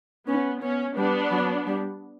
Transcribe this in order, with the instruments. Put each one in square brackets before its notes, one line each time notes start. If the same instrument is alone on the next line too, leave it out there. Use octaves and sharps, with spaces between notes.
[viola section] B3 [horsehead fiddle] C#4
[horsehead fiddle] B3 [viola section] C#4
[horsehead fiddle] G3 [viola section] B3 D4
[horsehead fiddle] F#3
G3